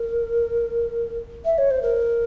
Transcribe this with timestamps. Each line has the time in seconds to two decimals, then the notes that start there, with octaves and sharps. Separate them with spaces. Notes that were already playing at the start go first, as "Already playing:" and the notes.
Already playing: A#4
1.45 E5
1.58 C#5
1.70 C5
1.82 A#4